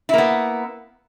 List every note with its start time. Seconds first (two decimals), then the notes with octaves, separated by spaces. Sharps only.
0.09 E4
0.14 A#3
0.18 B3